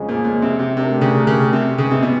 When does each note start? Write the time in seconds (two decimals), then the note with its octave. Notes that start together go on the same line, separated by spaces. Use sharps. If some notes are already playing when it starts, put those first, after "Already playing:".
Already playing: F2 C#3 F3 G#3
0.09 A#2
0.25 A#2
0.42 C3
0.59 C3
0.76 C3 A3 D4 G4 A#4
1.01 C#3
1.27 C#3
1.53 C3
1.78 G#2 C#3 E3 G#3 B3
1.91 C3
2.02 B2